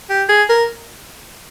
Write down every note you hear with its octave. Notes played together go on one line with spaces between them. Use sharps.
G4
G#4
A#4